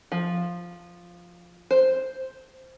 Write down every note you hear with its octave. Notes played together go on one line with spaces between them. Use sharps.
F3
C5